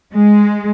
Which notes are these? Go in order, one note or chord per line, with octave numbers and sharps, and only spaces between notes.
G#3